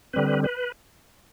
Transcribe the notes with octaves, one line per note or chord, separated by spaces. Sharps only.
D3 G3 C4 B4
B4